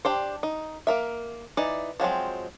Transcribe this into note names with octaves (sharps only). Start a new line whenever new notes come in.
D4 G4 C5
D#4
A#3 A#4 E5
E3 D#4 D5
F3 F#3 G#3 C4